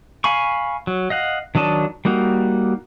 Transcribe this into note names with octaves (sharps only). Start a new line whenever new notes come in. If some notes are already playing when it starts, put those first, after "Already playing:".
F5 G#5 B5 C#6
F#3
D#5 F5 F#5
D#3 F#3 D4 D#5 A5
G3 A#3 D#4 F#4